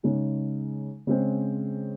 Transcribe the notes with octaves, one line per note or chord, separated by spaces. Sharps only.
C#3 G#3 D#4
C#3 G#3 C4